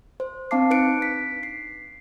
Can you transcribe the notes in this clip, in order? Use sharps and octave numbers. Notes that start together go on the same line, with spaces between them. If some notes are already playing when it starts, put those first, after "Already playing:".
C5
C4 D4 F5 A5 D6 C7
D#4 B4 F#6 C#7 D7
B6
C7